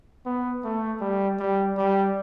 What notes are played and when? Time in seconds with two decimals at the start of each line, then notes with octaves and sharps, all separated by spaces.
0.25 B3
0.64 A3
1.01 G3
1.39 G3
1.77 G3